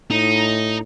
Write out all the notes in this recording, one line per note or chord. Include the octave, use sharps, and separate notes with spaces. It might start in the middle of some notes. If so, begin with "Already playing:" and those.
A2 D#4